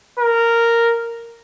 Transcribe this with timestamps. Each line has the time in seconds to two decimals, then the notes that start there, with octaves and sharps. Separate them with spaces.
0.20 A#4